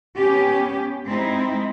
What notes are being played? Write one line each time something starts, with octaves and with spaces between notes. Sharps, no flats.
B3 C#4 G4
G#3 C4 D#4 E4